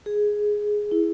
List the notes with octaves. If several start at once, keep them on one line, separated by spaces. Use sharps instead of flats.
G#4
E4